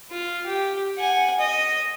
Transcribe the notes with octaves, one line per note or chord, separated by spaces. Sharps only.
F4
G4
F#5 G#5
D#5